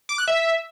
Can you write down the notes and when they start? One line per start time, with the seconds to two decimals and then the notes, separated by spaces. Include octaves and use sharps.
0.09 D6
0.18 F#6
0.28 E5